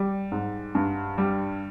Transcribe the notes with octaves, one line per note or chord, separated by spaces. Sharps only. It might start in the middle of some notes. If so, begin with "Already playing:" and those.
Already playing: G3
G#2
G2
G3